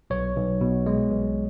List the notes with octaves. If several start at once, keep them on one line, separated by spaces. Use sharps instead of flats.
B1 C#5
B1
B2
G#3
B1